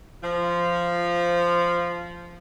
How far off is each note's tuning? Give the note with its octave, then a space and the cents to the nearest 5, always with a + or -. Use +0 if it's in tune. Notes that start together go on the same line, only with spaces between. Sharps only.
F3 -10